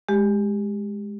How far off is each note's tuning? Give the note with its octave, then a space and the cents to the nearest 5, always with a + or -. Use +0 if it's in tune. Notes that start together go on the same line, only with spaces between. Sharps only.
G#3 +0 G4 +10